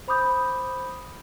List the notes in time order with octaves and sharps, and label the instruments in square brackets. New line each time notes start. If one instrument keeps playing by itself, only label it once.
[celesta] C5 B5 D6 D#6 G6